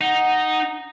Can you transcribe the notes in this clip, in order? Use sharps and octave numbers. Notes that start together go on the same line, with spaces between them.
D#4 F#5